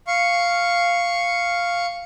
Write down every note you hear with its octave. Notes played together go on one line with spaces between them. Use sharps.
F5 C#6